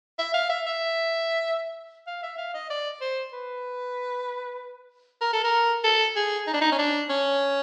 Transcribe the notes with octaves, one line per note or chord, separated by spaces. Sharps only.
E5
F5
E5
E5
F5
E5
F5
D#5
D5
C5
B4
A#4
A4
A#4
A4
G#4
D#4
D4
D#4
C#4
D4
C#4